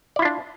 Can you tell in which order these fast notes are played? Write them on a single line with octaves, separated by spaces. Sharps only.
D5 E4 F4 D4